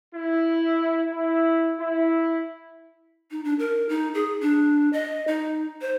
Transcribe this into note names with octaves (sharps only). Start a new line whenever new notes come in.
E4
E4
E4
D#4
D4
A#4
D#4
G#4
D4
D#5
D#4
C5